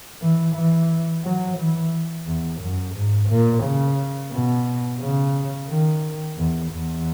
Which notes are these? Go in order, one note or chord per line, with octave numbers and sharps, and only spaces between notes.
E3
E3
F#3
E3
E2
F#2
G#2
A#2
C#3
B2
C#3
D#3
E2
E2